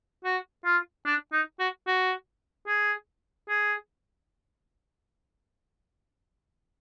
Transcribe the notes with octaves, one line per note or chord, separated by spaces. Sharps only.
F#4
F4
D4
D#4
F#4
F#4
G#4
G#4